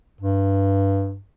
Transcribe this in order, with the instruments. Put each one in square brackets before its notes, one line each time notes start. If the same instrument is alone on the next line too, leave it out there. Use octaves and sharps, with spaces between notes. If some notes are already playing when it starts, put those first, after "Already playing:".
[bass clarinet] G2